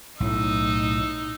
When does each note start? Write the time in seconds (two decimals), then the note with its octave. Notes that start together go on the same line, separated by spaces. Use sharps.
0.20 B1 A2 D#4 E6